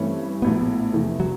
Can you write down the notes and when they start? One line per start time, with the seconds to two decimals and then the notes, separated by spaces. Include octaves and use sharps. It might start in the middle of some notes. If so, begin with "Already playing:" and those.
Already playing: G2 E3 A3 C4 C#4 E4
0.42 A#1 A2 F#3 B3
0.94 F1 E2 C3 E3 A3
1.20 F#3